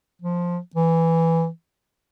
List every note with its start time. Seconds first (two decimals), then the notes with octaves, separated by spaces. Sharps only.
0.22 F3
0.75 E3